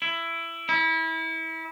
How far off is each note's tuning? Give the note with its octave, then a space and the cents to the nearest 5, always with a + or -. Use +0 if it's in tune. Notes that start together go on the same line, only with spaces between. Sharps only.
E4 +15
E4 -25